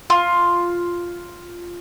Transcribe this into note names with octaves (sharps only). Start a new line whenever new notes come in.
F4